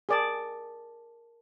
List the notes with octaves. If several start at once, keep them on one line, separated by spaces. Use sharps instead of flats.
G#4 A#4 D5 A5